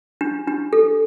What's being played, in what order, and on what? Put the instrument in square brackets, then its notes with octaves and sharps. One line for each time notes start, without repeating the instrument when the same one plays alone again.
[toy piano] D4
D4
A4